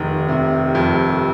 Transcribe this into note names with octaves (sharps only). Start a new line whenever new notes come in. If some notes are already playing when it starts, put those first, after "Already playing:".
Already playing: F1 D#3
C3
F2